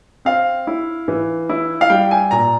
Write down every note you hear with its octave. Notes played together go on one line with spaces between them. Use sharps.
C4 F5
E4
E3
E4
F5
G3 G5
G#5
A#2 A#5